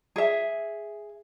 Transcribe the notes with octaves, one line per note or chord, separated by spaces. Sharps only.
G#4 E5